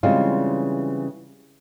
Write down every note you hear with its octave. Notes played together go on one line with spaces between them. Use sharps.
C#3 E3 G3 G#3 C4 F4